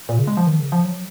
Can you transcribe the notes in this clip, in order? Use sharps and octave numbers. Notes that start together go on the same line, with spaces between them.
A#2
C#3
G#3
F3
D#3
C#3
F3
F#3